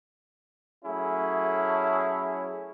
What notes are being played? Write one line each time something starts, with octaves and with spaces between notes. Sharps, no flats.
F#3 A3 C#4 E4 G#4